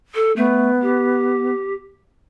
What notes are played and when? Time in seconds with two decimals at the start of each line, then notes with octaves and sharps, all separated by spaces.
0.15 A4
0.37 A3 B3
0.82 G4